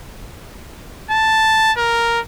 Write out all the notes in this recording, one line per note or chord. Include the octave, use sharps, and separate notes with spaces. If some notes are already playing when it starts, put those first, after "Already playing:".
A5
A#4